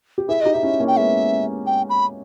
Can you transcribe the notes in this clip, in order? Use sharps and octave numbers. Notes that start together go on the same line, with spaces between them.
G4
E4 G#4 E5
D#4 G4 D#5
D#4 E5
C#4 E4
A#3 C#4
G5
G#3 B3 E5
G5
B5